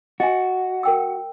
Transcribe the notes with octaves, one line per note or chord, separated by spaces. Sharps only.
F#4 D#5 G#5
A#4 G5 E6